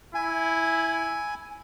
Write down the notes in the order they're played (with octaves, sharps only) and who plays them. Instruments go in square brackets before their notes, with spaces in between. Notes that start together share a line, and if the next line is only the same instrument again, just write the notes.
[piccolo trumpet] E4 [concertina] G#5